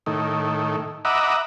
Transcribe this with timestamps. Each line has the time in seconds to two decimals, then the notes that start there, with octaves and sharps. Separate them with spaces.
0.06 A2 D#3
1.05 D#5 E5 F#5 A#5 B5 D6